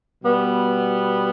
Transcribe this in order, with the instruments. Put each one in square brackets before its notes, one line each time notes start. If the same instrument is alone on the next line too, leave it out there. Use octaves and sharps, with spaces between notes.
[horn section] B2 G3 B3